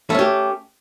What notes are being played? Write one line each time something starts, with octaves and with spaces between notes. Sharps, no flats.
A3 C#4 G4